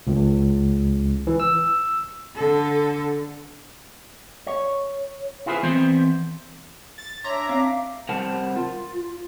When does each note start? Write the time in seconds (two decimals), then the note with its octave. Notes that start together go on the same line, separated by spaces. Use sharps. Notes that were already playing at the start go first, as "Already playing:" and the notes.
0.07 C#2
1.27 E3
1.40 E6
2.35 D3 A4
4.47 C#5
5.46 E4 F4 G#4 B4 C5
5.63 E3 B3 C4 C5
6.98 A6
7.24 D4 C#5 E5 A#5 C6 D6 G#6 A6
7.49 C4 F5
8.09 C3 G3 A#4 C5 F#5 A5
8.56 F4